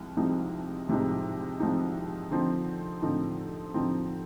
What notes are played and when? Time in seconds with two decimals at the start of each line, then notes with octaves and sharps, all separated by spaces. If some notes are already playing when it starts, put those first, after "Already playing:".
Already playing: C2 F3 G#3
0.17 C2 C3 F3 G#3 D#4
0.88 C2 C3 F3 G#3 D#4
1.60 C2 C3 F3 G#3 D#4
2.31 D3 F3 C4 D#4
3.02 D3 F3 C4 D#4
3.74 D3 F3 C4 D#4